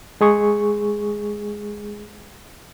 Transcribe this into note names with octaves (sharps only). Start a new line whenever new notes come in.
G#3 G#4 C#6